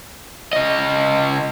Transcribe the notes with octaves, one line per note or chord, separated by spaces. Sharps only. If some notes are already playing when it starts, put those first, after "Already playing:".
C#3 D#5